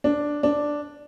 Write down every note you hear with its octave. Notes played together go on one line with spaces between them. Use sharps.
D4
D4